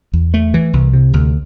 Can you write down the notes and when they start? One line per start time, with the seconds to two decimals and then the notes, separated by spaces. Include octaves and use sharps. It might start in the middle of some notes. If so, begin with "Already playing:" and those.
0.13 E2
0.34 A3
0.54 E3
0.73 C2
0.93 C3
1.13 D2